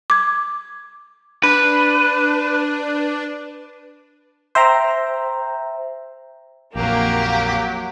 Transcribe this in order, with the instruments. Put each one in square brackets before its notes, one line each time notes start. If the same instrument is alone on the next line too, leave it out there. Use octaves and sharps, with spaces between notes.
[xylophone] D6 G#6
[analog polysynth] D4 [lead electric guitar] B4
[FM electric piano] C5 E5 G5 A#5
[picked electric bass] A#1 F2 [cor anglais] F#3 [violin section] A#3 [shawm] G4